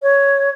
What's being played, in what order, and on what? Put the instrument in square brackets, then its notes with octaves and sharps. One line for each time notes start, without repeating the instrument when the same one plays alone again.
[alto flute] C#5